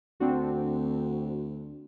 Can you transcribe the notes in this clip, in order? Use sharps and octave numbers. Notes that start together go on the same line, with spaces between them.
D2 C4 D4 F#4